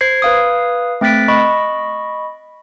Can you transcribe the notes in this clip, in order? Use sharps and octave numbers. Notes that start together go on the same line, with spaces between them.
C5 G#6 C7
B4 F5 D#6
A3 C4 F#6 A6 B6 D7
D#5 B5 C#6